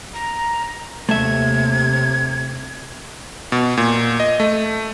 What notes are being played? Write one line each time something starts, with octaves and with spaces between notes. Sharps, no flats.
A#5
D#2 C3 A3 E5 G#6
B2
A#2
D#5
A3